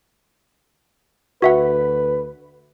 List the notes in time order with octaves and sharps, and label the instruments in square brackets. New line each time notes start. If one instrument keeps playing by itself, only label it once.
[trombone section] D2 B4 [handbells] F#4 E5 F#5